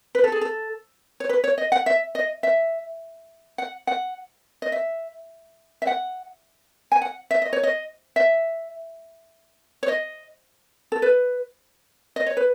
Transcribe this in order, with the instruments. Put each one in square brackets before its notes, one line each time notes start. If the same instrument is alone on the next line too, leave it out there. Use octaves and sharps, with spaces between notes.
[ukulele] B4
A4
G#4
A4
C#5
B4
C#5
D#5
F#5
E5
D#5
E5
F#5
F#5
D#5
E5
E5
F#5
G#5
F#5
E5
D#5
C#5
D#5
E5
C#5
D#5
A4
B4
D#5
C#5
B4